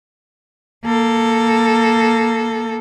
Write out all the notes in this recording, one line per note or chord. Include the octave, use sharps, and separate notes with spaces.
A#3 A4